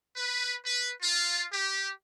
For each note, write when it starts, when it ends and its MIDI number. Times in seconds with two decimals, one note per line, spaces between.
0.17 0.56 71
0.65 0.91 71
1.01 1.46 65
1.52 1.90 67